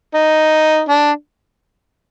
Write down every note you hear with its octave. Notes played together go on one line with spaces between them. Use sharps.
D#4
D4